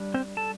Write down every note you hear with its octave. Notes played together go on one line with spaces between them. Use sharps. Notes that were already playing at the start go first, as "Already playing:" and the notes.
Already playing: G3 D4
C4 C5
A4 A5